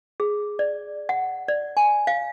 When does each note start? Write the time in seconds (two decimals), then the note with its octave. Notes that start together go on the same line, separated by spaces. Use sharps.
0.20 G#4
0.59 D5
1.09 F#5
1.48 D5
1.77 G#5
2.07 F5